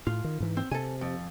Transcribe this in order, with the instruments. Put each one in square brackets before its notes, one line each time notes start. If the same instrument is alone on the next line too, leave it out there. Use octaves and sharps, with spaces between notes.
[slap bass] A2 [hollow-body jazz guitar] F4
[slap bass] D#3
G#2 E3
[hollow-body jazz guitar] C4
[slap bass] C3 [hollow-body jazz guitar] A4 G#5
[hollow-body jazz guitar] F2